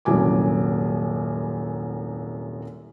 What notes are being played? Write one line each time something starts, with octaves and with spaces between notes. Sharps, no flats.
D#1 C2 F#2 G#5 D6